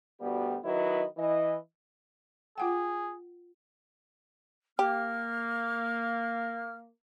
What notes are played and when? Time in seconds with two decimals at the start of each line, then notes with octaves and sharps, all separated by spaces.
0.21 D2 B2 G3 B3 G4
0.64 D#3 F#3 E4 B4 D#5
1.18 E3 D#5
2.58 F4 G#4 F#5 G5
4.79 A#3 G4 F6